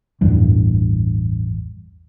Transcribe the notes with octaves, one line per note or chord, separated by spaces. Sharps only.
A1 E2 G2